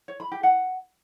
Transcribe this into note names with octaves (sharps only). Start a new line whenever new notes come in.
C#5
B5
G4
F#5